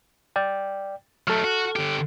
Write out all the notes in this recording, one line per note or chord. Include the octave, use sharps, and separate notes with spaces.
D5 G5
F#3 A3 A4 F6
F#4
D3 G4